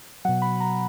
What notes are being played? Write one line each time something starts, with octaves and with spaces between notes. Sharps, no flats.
B2 F#3 F#5
B5
A#5